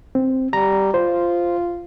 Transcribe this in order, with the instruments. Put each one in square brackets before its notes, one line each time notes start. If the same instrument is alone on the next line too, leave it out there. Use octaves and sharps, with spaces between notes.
[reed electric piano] C4
[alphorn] G3 [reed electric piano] A#5
[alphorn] F4 [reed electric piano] C5